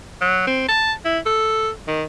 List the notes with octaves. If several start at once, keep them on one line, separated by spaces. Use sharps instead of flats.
F#3
C4
A5
E4
A4
D#3